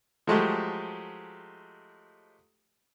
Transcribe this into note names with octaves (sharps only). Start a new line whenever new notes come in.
F3 F#3 G#3 A3 G4